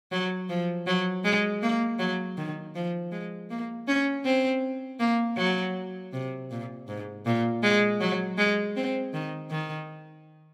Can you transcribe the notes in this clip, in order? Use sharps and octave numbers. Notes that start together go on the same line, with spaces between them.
F#3
F3
F#3
G#3
A#3
F#3
D#3
F3
G#3
A#3
C#4
C4
A#3
F#3
C3
A#2
G#2
A#2
G#3
F#3
G#3
C4
D#3
D#3